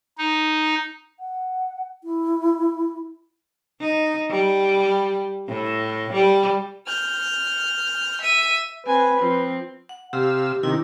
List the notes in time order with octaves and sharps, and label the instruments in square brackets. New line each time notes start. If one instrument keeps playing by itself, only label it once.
[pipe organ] D#4
[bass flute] F#5
E4
[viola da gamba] D#4
G3
A2
G3
[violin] F6 G6
E5 D#7
[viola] C4 G#5 [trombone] B4
[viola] F3 C4
[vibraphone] F#5
[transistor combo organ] C3 F5 E6 [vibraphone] G4
[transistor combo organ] C3 D#3 [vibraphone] D4 E4